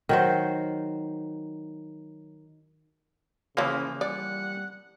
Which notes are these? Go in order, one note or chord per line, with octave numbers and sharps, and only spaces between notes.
D#3 F#3 C5
C#3 E3 F3 A#3 C#4 F4 C5
G3 D5 F#5